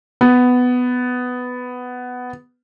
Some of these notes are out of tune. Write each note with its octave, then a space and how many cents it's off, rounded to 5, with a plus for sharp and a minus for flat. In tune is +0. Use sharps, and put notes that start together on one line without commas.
B3 +10